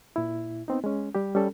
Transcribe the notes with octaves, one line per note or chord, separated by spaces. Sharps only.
A#2 E4
B3 C4 D#4
G#3 C#4
G3 G4
G3 C#4 A4